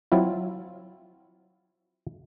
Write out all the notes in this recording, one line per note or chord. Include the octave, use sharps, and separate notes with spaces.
F#3 C4 E4 F4